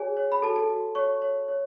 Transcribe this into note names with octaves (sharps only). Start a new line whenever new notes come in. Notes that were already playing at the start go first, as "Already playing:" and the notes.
Already playing: F#4 G#4 C#5 G#5
C#5
B5
F#4 A4 A5
A4 A5
F#4
C#5 C#6
C#5
C#5